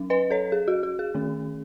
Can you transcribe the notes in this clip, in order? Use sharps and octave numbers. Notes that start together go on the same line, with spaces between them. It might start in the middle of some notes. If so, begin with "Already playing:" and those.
Already playing: F#3 C#4
B4 D#5
A4 C#5
G#4
F#4
F#4
G#4
D#3 A3 C#4